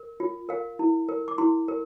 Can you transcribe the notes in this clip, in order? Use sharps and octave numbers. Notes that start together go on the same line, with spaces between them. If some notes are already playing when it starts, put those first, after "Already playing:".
Already playing: A#4
F4
A#4 F5
E4
A#4
D6
E4 C6
A#4